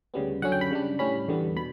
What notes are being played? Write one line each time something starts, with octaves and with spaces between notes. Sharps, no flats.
D2 C#3 G3 B3
F#2 D3 F#3 C#4 F#5
G5
B5
C#3 G3 D4
A2 G3 C#4 B5
E2 D3 G3 B3
B2 B5